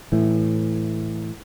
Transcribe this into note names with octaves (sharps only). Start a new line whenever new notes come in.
A2 E3